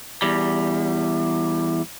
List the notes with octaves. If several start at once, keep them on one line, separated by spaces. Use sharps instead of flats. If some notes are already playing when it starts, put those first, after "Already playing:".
E2 G3